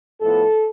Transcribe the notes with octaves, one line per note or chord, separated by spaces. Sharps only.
A2 F3 B3 A4